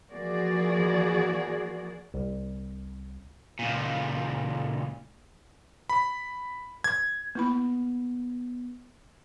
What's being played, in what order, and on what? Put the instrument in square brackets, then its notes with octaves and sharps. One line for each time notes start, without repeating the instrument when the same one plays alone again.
[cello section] E3 F3 A#3 F#4 G#4 D5
[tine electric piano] C2
[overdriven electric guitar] C#2 A#2
[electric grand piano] B5
G#6
[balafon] A#3 E4 B5 [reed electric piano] B3